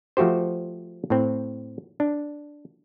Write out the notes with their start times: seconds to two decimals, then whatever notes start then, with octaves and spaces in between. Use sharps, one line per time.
0.17 F3 A3 F#4 G4 C5
1.10 A2 C4
2.00 D4